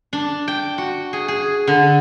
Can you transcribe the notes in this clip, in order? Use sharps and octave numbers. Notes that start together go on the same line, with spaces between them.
D4
G5
F#4
G#4
G#4
D3